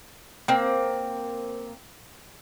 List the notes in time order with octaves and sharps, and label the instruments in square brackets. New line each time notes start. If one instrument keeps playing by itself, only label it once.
[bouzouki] A#3 C4